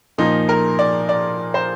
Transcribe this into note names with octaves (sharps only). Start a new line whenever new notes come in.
A#2 F3 A#3 D#4
A#4
D5
D5
C5